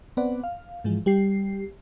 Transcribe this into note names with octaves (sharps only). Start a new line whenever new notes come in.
B3 C4 B4 D5 F#5
F5
G#2 E3 F3 G#3
G3 G4 C7